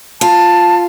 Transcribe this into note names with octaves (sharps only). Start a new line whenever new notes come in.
F4 A5